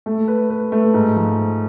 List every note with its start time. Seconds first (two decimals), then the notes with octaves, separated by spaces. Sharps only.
0.06 A3
0.28 B4
0.50 B4
0.72 A3
0.94 G#2
1.16 F3